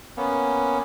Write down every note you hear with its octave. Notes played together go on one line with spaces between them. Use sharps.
A#3 B3 C#4